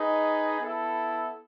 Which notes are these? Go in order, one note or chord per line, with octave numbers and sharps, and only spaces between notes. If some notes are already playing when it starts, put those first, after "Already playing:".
Already playing: D#4 G#4 B4 D#5
B3 E4 A4